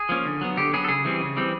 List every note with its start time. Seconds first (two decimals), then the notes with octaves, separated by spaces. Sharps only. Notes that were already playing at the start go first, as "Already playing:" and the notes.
Already playing: G#4
0.09 F3 A#3 C#4
0.25 D3
0.41 F#3 B3
0.57 D3 G4
0.73 F#3 B3 G#4
0.84 A4
0.89 C#3 G#4
1.05 E3 G3 C4
1.21 C#3
1.36 E3 G3 C4